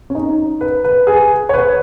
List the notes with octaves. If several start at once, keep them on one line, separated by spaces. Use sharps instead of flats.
C#4
D#4
B4
B4
G#4
C#5
B4